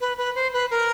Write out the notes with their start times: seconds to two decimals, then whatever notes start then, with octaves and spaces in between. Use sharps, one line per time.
0.01 B4
0.18 B4
0.35 C5
0.53 B4
0.71 A#4